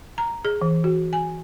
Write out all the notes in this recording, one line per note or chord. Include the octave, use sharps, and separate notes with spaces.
A#5
G#4
E3
F#4
G#5